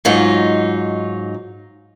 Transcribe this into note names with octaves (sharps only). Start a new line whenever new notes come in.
G#2 F#3 D#4 F4